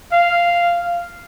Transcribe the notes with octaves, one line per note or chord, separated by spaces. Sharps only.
F5